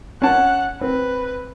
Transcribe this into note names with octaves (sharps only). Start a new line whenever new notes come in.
C#4 F#5 A5
C4 B4